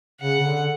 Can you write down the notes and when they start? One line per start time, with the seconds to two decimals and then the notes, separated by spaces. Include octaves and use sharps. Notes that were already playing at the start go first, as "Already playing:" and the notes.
0.21 C#3 F#5
0.40 C#3
0.46 D3